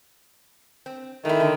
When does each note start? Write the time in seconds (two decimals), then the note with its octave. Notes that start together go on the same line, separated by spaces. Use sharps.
0.86 C4
1.25 D#3 A3 E4
1.40 D3